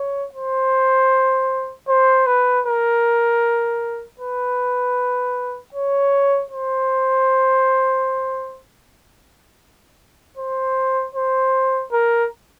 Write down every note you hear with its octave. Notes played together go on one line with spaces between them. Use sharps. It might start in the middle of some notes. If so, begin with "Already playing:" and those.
Already playing: C#5
C5
C5
B4
A#4
B4
C#5
C5
C5
C5
A#4